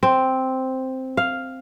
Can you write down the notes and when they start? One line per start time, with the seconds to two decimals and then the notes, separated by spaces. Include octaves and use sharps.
0.03 C4
1.17 F5